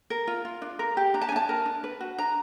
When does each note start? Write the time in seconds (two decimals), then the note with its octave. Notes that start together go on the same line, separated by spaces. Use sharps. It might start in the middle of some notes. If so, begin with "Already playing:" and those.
0.10 A#4
0.27 F4
0.45 F4
0.62 D4
0.79 A#4
0.97 G4
1.14 D4 A#5
1.21 A5
1.29 G#5
1.32 D4 A5
1.49 A#4
1.66 D4
1.84 B4
2.01 F#4
2.18 D4 A#5